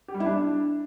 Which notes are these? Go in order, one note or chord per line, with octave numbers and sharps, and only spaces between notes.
G4
G3
E4
D4